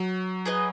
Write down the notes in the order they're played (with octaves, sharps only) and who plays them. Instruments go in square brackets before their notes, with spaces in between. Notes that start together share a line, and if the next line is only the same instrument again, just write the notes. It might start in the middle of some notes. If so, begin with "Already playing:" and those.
Already playing: [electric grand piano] F#3
[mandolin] G#4 B4 D#5